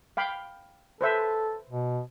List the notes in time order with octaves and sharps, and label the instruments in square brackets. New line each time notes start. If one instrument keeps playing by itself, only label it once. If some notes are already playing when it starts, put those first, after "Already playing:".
[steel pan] F5 G5 B5
[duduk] A4 [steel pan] B4 C5 E5
[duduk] B2